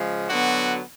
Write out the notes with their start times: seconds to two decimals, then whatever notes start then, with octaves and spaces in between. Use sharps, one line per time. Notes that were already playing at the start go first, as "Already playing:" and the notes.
Already playing: C#3 F3 G#3
0.28 D3 F#3 B3 F#4